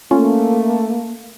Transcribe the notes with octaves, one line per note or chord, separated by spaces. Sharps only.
A3 A#3 C#4 F4